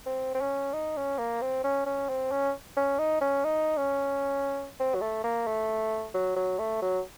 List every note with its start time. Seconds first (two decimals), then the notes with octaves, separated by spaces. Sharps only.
0.06 C4
0.35 C4
0.41 C#4
0.73 D#4
0.97 C#4
1.18 A#3
1.42 C4
1.64 C#4
1.86 C#4
2.09 C4
2.31 C#4
2.77 C#4
2.99 D#4
3.21 C#4
3.44 D#4
3.77 C#4
4.80 C4
4.95 F#3
5.01 A3
5.24 A#3
5.47 A3
6.14 F#3
6.36 F#3
6.59 A3
6.82 F#3